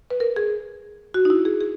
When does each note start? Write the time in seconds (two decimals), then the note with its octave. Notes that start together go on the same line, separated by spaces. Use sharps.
0.11 B4
0.20 A#4
0.36 G#4
1.14 F#4
1.25 D#4
1.30 E4
1.45 G#4
1.61 G#4